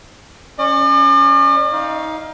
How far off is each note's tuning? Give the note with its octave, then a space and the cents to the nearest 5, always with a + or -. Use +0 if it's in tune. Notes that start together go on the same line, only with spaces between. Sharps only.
C#4 +0 D5 +45
D#4 +25 F5 +0